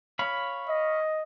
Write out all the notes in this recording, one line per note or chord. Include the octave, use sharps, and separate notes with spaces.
C#5 F5 B5
D#5